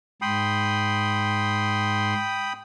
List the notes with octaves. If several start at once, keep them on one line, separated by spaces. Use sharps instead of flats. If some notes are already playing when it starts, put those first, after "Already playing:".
G#2 G5 B5 C6 D#6